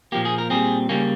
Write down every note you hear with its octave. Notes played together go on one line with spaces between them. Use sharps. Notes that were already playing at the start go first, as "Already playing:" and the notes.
A#2 F3 A#3 G4
G#4
A#4
A#2 G3 C4 G#4
C#3 G3 A#3 C#4